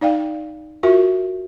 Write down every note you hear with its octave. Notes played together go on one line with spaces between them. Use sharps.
D#4 D5 F5 G5
F4 F#4 A#4 E5